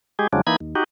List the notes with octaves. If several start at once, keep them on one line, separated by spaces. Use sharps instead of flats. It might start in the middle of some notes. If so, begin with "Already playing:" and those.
G#3 G4 G#4
E2 C#3 F3 F#3 G#3 D4
E3 A#3 D#4 B5 G#6
D#2
D#4 F#4 G4